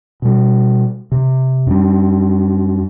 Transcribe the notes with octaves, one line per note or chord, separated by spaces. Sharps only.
B2 G3
C3
F#2 G3